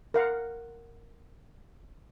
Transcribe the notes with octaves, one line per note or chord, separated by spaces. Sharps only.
A#4 F5 F#5